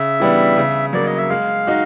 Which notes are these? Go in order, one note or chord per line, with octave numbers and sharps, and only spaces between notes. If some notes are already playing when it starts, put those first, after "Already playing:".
Already playing: C#3 E5
E3 G3 B3 D4
C#3
F#3 A#3 D5
D#5
E5
G#3 F5
D#4 F#4